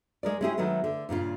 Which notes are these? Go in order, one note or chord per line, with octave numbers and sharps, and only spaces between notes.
G#3 A#4 D5
G#3 B3 C#4 E4 G4 G#4
D#3 F#3 G#3 A3 B3
D3
G2 A#2 C#3 F4